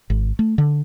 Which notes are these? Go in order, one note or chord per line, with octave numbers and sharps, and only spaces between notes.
G#1
A3
D3